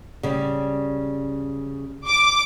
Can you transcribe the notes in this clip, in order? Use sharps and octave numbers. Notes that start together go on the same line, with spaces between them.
C#3 G3
D6